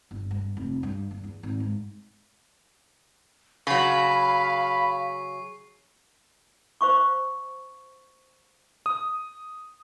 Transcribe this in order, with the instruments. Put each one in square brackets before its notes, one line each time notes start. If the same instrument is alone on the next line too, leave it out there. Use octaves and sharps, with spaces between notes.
[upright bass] G1
G2
F1
G2
G1
E2
G#1
G#2
[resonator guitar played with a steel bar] C#3 F#3 [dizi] F5 [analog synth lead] B5 [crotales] C#6 C7
[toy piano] C5 F5 C#6 D6
[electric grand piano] D#6